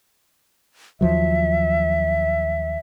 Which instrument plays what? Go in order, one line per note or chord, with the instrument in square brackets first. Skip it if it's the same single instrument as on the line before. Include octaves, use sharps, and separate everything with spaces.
[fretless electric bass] D#2 F3 F#3 [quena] E5